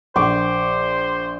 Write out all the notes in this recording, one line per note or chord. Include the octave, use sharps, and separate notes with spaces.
A#1 C5 C#6 D6